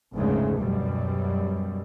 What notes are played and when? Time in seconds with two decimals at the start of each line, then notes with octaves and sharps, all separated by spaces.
0.15 F1 D2 G#2 C#3 G#3 A3
0.57 F#2 B2 G3